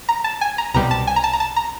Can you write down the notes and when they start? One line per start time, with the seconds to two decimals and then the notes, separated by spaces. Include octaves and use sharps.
0.09 A#5
0.24 A5
0.41 G#5
0.58 A#5
0.74 C2 B2 G3 A#5
0.91 A5
1.07 G#5
1.16 A#5
1.24 A5
1.33 A#5
1.40 A5
1.56 A#5